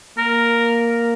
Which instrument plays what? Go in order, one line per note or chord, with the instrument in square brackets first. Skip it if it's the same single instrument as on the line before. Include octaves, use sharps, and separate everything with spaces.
[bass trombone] A#3 [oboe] A#4